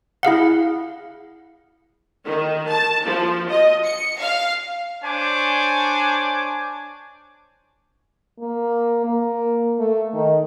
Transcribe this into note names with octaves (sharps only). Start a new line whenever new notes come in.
E4 G#4 F5 F#5
D#3
A5
F3
D#5
C#7
F5
D4 C5 C#5 G#5 A5 D6
A#3
A#3
A3
D#3